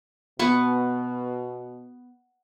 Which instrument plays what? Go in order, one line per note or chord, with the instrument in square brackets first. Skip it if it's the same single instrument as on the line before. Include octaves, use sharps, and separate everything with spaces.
[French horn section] B2 [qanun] B3 C#6